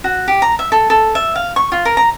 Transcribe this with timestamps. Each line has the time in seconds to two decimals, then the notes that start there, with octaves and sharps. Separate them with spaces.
0.04 F#4
0.28 G4
0.42 A#5
0.59 E5
0.72 A4
0.90 A4
1.15 E5
1.35 F5
1.56 C#6
1.72 F4
1.85 A#4
1.97 A#5